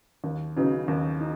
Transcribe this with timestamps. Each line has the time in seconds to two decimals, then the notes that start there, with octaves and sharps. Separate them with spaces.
0.24 D#2
0.57 C#3 F#3 B3 D#4
0.88 D#2
1.21 D#4